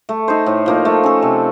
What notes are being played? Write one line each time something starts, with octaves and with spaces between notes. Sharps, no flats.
A3
D#4 A4 C5
A2
F3 A#3 D#4
A3
C#4 A4
C3